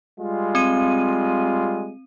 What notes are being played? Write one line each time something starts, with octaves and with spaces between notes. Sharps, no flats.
G3 G#3 F4
C4 D#7